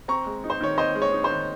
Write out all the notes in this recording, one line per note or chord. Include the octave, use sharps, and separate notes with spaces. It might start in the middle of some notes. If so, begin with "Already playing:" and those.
C4 A#5 C#6
G#3
D#4
C5
D#3 C#5
C4 C5 D#5
G#3
C#5
D#4
C5
D#3